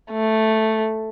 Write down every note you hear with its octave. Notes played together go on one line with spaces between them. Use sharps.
A3